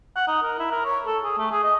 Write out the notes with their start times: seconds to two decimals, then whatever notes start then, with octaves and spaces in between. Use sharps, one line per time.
0.16 F#5
0.28 D#4
0.43 A#4
0.59 E4
0.71 A#4
0.85 C#5
1.06 A4
1.23 G#4
1.38 A3
1.52 G#4
1.64 D#5